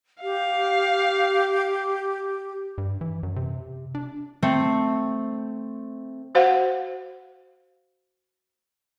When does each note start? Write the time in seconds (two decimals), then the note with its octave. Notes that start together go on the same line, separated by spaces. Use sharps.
0.22 G4 F5
2.78 G2
3.01 E3
3.23 F#2
3.36 C3
3.95 D4
4.42 A3 C4
6.35 F#4 C5 F5 F#5